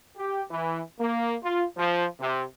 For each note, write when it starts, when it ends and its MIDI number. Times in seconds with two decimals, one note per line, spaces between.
0.17 0.42 67
0.50 0.80 52
0.99 1.36 58
1.43 1.64 65
1.76 2.05 53
2.20 2.43 48